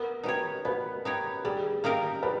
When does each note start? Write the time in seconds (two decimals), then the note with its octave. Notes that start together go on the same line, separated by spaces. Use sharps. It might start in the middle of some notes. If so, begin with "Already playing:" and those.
Already playing: B3 A#4
0.24 D#4 G4 B4 C#5
0.65 B3 B4
1.05 D#4 G4 C#5
1.44 G3 G#4
1.84 A#3 D#4 G4 A#4
2.23 G3 B4